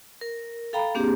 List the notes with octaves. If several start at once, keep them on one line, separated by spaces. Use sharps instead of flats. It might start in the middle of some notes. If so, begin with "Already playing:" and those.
A#4
A4 F5 G5 A#5 B5
A#3 C4 D4 G4 G#4